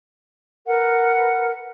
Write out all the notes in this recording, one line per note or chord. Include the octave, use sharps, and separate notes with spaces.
A#4 B4 F#5